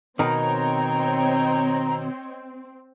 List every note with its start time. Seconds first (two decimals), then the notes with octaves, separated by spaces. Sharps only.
0.19 B2 D#3 C4 C#5 D#5 G5 A#5